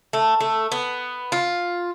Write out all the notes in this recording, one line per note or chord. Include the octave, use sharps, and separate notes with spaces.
A3
A3
B3
F4